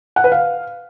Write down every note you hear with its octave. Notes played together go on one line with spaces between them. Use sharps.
F#5
B4
F5